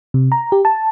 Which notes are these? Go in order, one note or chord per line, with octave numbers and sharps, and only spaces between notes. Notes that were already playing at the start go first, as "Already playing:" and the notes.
C3
A#5
G4
A5